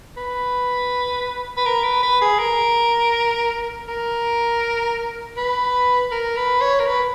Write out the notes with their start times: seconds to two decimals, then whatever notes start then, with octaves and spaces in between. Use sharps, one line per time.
0.17 B4
1.57 B4
1.66 A#4
1.84 B4
2.03 B4
2.21 G#4
2.39 A#4
3.88 A#4
5.37 B4
6.12 A#4
6.37 B4
6.61 C#5
6.80 A#4
6.86 B4